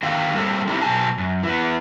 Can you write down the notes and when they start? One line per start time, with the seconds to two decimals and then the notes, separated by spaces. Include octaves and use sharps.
0.03 D3 D#3 F#4 F5 G5
0.34 G3 A#3 C4 A4 C#5
0.67 C4 D#4 E4 G4 A4
0.82 B2 F#3 G#5 A5
1.18 F#2
1.43 E3 B3